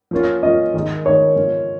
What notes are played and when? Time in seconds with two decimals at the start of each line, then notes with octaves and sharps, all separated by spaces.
0.11 F3 A#3 C#4 F4
0.43 F3 A#3 C#4 F4 D#5
0.74 D#3 G#3 D#4
1.05 D#3 G#3 D#4 C#5
1.36 C#3 F3 G#3 C#4 F4